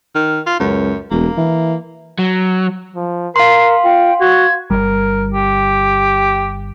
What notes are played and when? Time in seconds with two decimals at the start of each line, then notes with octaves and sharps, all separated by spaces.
0.15 D#3
0.46 F4
0.60 C#2 F#2
1.11 E1 A#3
1.37 E3
2.19 F#3
2.96 F3
3.36 A#4 F5 C6 C7
3.84 F4 G5
4.20 F#4 G#6
4.70 G1 C2 G3 A#4
5.34 G4